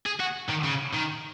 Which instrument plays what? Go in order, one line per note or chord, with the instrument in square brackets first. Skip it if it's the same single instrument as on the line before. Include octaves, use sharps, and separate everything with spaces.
[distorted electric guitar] G#4
F#4
D#3
C#3
D#3